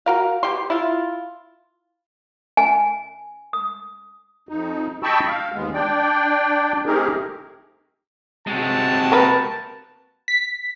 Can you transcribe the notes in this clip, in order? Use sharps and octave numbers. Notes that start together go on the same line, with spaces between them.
F#4 A#4 F5
B2 G4 C6
E4 F4
G#5
D#6
F2 D#4
D#5 G5 A5 B5 C#6 E6
F5
D#2 G#3 B3
D4 D5 G5
A3 C4 D#4 G4 G#4 A#4
C3 G#3 F#4 G5 A5
A#3 A#4 B4
B6